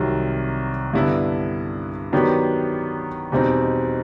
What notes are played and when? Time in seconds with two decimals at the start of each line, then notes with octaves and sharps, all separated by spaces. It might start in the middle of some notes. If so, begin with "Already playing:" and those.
Already playing: C2 C3 D#3 F#3
0.94 G2 D3 G3 B3 E4
2.12 D#3 F#3 B3 D4 G4
3.32 E2 B2 G3 C4 D#4